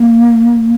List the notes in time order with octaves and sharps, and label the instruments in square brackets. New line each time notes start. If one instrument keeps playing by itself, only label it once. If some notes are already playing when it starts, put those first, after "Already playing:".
Already playing: [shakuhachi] A#3